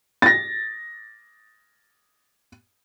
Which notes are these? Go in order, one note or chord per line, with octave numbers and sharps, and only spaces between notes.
A6 A#6